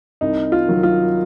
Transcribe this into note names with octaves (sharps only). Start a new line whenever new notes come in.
C2 D#4
F4
C3 D#3 F#3
F4